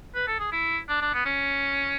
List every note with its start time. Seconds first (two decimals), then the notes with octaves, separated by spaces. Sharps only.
0.15 B4
0.27 A4
0.39 G#4
0.52 E4
0.89 D4
1.01 D4
1.14 B3
1.26 C#4